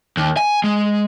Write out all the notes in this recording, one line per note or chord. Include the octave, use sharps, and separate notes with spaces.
D#2
G#5
G#3